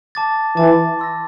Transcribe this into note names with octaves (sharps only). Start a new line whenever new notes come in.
A5 D6 A6
E3 A5 D6 A6
C6 E6 A#6